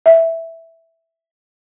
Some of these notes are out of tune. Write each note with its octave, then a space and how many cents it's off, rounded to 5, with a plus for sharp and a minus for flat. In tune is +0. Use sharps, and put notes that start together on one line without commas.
E5 +0